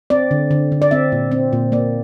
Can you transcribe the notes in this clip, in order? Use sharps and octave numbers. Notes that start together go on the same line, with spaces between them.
C4 D5
D3
D3
D3
D5
C4 E5
A#2
C4
A#2
A#3 D5